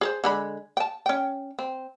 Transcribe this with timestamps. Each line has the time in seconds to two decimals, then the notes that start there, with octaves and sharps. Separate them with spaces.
0.01 G#4 A#4 C5
0.24 D3 G#3 B5
0.77 G5 A5
1.06 C#4 G5
1.59 C4